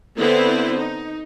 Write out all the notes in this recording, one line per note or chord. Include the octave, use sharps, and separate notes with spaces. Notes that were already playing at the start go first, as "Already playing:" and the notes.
D3 B3 C4 E4 B4 C5
D#4